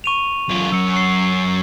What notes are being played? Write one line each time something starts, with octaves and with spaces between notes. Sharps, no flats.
C#6 D#7 F7
F#2 F4
F#2 E6 C#7
C#6 C7